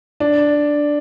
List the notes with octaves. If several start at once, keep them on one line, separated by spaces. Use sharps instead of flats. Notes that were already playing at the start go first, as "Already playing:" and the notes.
D4